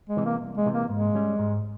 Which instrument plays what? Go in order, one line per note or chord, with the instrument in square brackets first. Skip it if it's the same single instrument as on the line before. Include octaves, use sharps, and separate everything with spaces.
[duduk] G#3
[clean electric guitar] C3 E3
[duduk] A#3
[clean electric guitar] C2
[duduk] G#3
[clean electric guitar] C3 E3
[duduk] A#3
[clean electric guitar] G#2 [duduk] G#3
[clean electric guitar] G3 C#4
G#2